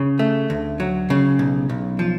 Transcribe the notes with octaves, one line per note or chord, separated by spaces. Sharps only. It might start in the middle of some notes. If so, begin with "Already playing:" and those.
Already playing: C#3
A3
D2
F#3
C#3
B1
B1
F3